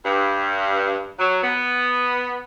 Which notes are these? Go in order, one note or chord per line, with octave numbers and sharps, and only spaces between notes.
G2
F#3
B3